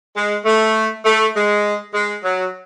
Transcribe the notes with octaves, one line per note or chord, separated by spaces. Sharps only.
G#3
A3
A3
G#3
G#3
F#3